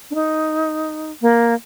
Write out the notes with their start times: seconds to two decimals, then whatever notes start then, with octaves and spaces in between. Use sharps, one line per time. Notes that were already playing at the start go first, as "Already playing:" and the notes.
0.11 D4
0.15 D#4
1.22 A#3